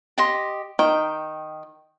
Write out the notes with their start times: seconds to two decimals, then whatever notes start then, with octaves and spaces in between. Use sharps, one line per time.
0.18 G4 D#5 C6
0.79 D#3 G5